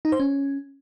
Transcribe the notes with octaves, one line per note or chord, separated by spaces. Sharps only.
D#4
C5
C#4